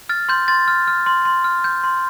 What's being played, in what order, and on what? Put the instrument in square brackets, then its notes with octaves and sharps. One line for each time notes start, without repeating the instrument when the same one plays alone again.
[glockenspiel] F6 A6
C6 G6
C6 A6
F6
F6
C6
C6
F6
G6
C6